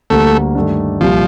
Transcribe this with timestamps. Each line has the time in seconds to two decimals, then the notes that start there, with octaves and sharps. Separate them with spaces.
0.10 D2 D3 G3 A3 A#3
0.55 G2 D#3 A3 D4
1.00 C2 A#2 F3 G3